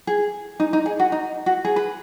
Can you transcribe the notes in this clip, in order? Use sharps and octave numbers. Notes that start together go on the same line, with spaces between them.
G#4
D#4
D#4
G#4
F#4
D#4
F#4
G#4
B4